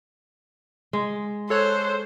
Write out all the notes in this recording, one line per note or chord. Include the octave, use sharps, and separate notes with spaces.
G#3
A4 C5 C#5 F#6